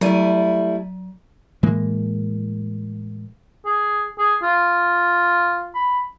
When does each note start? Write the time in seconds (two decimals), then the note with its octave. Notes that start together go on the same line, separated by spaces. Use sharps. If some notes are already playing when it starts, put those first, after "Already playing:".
0.01 F#3 G3 A3 E4 D#7
1.63 A2 E3 G#3 A#3
3.65 G#4
4.18 G#4
4.43 F4
5.75 B5